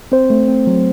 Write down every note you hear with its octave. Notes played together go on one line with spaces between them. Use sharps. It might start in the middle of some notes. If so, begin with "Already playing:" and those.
C4 C5
A3
C4
F#3